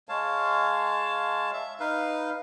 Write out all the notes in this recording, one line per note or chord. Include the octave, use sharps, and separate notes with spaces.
G#3 C#5 F5 A5
E5
D#4 B4 F5